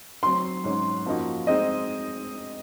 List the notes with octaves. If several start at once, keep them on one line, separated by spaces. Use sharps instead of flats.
F#3 C4 F#4 C6
G#2 F#3 C#4
F#2 F3 A#3 D#4 F#4
G#3 C4 D#4 D#5